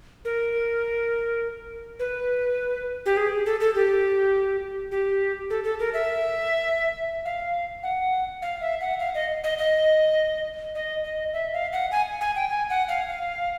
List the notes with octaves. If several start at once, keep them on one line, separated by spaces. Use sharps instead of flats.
A#4
B4
G4
G#4
A4
A4
G4
G4
A4
A4
A#4
E5
F5
F#5
F5
E5
F#5
F5
D#5
D#5
D#5
D#5
D#5
E5
F5
F#5
G#5
G#5
G5
G#5
F#5
F5
F5